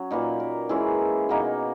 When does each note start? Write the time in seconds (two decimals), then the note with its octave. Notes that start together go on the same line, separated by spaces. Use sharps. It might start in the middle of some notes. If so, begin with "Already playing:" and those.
Already playing: F#3 C#4
0.11 A#2 A#3 D#4 B4
0.40 A#4
0.69 E3 G#3 C#4 E4 G#4
1.29 B2 A#3 D#4